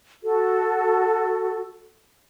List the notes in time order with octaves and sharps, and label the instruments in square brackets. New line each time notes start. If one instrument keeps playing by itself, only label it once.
[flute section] F#4 A4